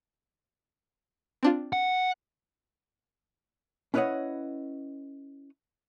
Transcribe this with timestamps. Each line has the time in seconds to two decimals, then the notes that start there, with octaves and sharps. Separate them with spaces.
1.43 C4 D4 F4
1.73 F#5
3.94 C#4 E4 B4 C#5 D#5 F#5